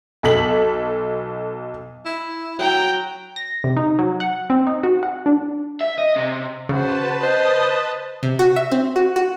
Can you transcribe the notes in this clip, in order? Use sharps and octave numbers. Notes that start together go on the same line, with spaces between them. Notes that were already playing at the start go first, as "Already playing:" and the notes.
B1 A4 B6 F#7
E4
F#3 G5 A#5
A#6
C3
D#4
F#3
F#5
C4
D#4
F#4
F#5
D4
E5
D#5
C3
C#3 F#4 B4 C5 A5
C5 D#5
C3
F#4
E5
C4
F#4
F#4